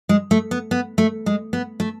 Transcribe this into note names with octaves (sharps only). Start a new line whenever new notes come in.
G#3
A3
B3
B3
A3
G#3
B3
A3